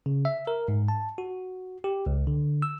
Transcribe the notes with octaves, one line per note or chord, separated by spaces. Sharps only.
C#3
E5
A#4
G#2
A5
F#4
G4
C#2
D3
E6